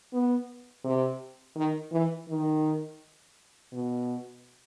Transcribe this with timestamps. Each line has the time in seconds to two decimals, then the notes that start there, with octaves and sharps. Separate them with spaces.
0.13 B3
0.84 C3
1.56 D#3
1.92 E3
2.29 D#3
3.72 B2